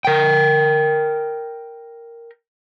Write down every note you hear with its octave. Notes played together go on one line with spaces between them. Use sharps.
A#4 G5